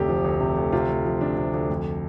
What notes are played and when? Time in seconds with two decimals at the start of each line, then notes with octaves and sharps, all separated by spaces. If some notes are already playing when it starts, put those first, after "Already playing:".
Already playing: F1 D2 C3 G4
0.09 F3
0.24 D2
0.40 C3
0.57 D2
0.72 C3 F4
0.89 D2
1.05 F3
1.21 D2 D4
1.37 C3
1.54 D2
1.70 F2